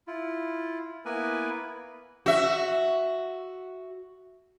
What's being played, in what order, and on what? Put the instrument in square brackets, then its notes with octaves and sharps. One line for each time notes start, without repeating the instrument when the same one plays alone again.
[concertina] E4 F4
A#3 B3 E4 A#4 B4 G#5
[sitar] F#4 E5